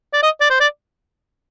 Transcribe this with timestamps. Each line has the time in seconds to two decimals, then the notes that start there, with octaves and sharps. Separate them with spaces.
0.13 D5
0.23 D#5
0.41 D5
0.50 C5
0.60 D5